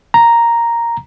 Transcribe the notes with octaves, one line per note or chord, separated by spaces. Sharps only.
A#5